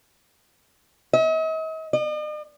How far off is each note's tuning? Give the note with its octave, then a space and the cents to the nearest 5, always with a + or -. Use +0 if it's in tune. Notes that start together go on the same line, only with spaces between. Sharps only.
D#5 +45
D#5 -45